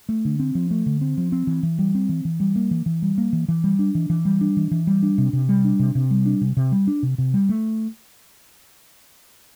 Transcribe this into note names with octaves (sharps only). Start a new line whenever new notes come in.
A3
D3
C4
F3
A3
D3
C4
F3
C4
E3
E3
G3
C4
E3
E3
G3
A#3
E3
E3
G3
A#3
E3
E3
G3
D4
E3
E3
G3
D4
E3
E3
G3
D4
C3
C3
G3
D4
C3
C3
G3
D4
C3
C3
G3
D4
C3
C3
G3
A3